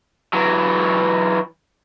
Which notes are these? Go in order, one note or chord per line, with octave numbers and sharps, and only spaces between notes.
E3 F#3